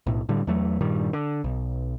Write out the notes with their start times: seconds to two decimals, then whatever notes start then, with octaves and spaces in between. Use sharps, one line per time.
0.07 B1 A2
0.29 A2 D3 G3
0.47 E2 F#3 A3
0.81 G2 A#2 D#3 G3
1.13 D3
1.44 B1